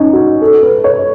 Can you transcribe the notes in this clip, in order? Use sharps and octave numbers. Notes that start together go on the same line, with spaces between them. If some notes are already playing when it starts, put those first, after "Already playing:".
Already playing: C#4 D#4
F#4
A4
B4
C#5